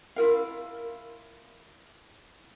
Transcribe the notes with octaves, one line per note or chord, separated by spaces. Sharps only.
E4 F4 A#4 F5